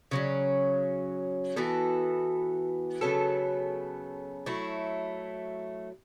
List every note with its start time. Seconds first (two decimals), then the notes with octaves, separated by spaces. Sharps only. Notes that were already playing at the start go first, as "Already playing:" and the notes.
0.11 C#3 F#3 C#4
1.56 E3 B3 F#4 A4
3.01 C#3 F#3 B3 A4
4.46 F#3 A3 E4